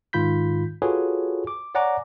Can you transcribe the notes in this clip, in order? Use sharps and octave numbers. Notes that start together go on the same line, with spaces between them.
G#2 D#3 F4 B5 G6 B6
F4 F#4 G#4 A4 B4 C#5
D6
C#5 D5 F#5 G#5 A#5 D6